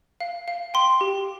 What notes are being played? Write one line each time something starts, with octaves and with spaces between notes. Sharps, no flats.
F5
F5
G5 C6
G4